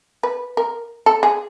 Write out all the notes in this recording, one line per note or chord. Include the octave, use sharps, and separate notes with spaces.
B4
A#4
A4
G#4